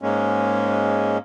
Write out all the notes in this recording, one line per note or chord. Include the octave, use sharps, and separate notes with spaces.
G#2 G#3 A#3 C#4